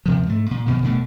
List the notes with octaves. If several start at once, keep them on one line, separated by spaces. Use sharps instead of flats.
D#2 C3 F3
G#2 A3
A#2
F2 B2 D#3
D#1 B2 A3